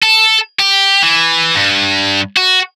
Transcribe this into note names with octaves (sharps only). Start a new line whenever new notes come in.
A4
G4
E3
G2
F#4